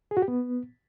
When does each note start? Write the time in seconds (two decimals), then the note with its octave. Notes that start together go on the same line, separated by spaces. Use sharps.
0.11 G#4
0.17 F#4
0.22 G4
0.28 B3